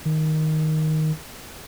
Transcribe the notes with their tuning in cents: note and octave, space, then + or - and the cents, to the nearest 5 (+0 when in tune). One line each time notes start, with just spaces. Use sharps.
D#3 +5